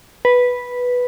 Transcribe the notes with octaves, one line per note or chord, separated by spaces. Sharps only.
B4